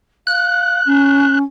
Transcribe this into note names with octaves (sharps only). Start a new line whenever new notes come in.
F5 F#6
C#4